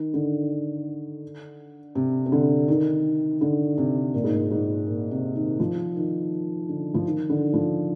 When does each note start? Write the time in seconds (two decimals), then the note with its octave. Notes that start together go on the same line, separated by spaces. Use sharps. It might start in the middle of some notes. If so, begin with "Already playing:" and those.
Already playing: D#3
0.14 D3
1.95 C3
2.26 C3
2.32 D3
2.68 D#3
3.41 D3
3.78 C3
4.14 A#2
4.24 G#2
4.34 A#2
4.50 G#2
4.87 A#2
5.11 C3
5.35 D#3
5.60 F3
5.96 D#3
6.69 D3
6.94 F3
7.05 D#3
7.30 D3
7.53 F3